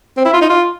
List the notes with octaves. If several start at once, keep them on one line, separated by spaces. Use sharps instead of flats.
C4
E4
F4
D#4
F4